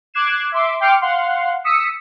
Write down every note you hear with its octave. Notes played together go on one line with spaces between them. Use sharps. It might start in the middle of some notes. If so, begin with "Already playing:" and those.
D6 F#6 G#6 C7 E7
E5 C6 D6
G5 C6 D6 F6 C#7
F5 F#5 C6
D#6 E6 B6 C#7